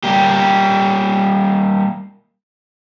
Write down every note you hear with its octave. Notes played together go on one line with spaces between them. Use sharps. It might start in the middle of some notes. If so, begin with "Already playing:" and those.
G3 A#3 G4